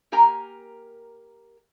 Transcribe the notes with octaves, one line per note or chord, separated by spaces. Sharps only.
A#3 G4 A#4 G#5 A#5